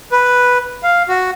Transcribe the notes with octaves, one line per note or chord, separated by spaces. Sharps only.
B4
F5
F#4